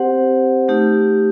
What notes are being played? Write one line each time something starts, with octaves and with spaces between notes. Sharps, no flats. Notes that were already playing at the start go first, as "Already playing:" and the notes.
Already playing: C4 G4 C5 F#5
A3 D#4 G4